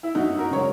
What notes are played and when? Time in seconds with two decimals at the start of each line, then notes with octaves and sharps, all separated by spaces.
0.03 E4
0.15 F#2 D#4 F#4
0.38 F#4 A#4
0.50 C#3 G#3 C#5